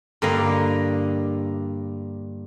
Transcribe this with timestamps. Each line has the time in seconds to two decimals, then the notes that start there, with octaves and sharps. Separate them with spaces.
0.22 G2 D3 A#3 D#5 A#5